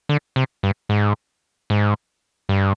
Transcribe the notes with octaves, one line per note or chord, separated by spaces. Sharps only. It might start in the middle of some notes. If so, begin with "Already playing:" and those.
D3
C3
G2
G#2
G#2
G2